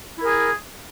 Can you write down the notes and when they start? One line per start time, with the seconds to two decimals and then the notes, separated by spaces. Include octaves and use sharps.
0.19 E4
0.22 A#4
0.25 G#4